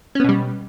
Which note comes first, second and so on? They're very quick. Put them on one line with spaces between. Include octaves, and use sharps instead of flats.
C#4 B3 B2 G3